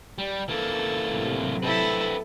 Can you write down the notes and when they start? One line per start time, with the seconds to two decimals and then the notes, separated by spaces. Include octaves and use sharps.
0.18 G3
0.49 C#3 E3 A#3 A4
1.05 A2 C3 F#3
1.63 C4 E4 A4 B4